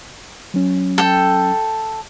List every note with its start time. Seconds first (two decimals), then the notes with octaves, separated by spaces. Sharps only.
0.54 F#3 C#4
0.98 A4 G5